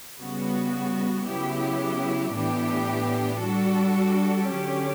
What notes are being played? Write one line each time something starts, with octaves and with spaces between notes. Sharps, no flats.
C#3 G3 B3 F#4
C#3 F#3 B3 E4 G4
A2 E3 B3 D4 G4
G3 D4 F#4 A4
D3 F#3 C#4 G4